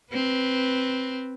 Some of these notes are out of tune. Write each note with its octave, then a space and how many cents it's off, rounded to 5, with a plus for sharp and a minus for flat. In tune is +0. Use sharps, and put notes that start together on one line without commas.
C4 +0 B4 +0